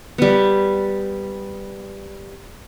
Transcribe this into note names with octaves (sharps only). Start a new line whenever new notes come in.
G3 B3